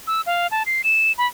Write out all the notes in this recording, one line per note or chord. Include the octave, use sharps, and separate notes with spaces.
E6
F5
A5
C7
E7
B5